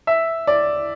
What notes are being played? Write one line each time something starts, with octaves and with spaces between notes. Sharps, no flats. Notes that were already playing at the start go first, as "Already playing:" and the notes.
E5
D5